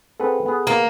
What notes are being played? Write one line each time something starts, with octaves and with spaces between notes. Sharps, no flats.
C4 G#4 A4 B4 F#5
B3 G#4
A#3